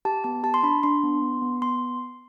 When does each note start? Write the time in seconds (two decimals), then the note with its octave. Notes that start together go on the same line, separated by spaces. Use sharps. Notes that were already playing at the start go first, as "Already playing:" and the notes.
0.05 G4 A5
0.24 B3 A5
0.43 G4 A5
0.54 C6
0.63 D4 B5
0.83 D4 C6
1.03 B3
1.22 B3
1.42 B3
1.62 B3 C6